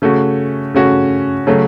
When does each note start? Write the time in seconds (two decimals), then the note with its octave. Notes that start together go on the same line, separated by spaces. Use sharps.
0.02 C#3 A3 C#4 F#4
0.74 C#3 A3 C#4 F#4
1.47 C#3 F#3 A3 C#4